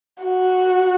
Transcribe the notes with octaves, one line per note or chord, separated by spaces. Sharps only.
F#4